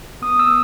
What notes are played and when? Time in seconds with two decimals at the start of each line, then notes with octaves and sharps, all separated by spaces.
0.22 B3 D#6
0.39 E6
0.47 B3